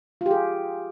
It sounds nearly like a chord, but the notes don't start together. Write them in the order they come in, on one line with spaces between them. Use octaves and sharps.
F4 G4 G#4